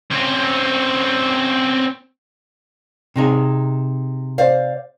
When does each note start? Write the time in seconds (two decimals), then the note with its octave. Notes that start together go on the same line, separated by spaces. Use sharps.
0.10 C4 C#4
3.16 C3 D#4 G#4
4.38 C5 D5 F5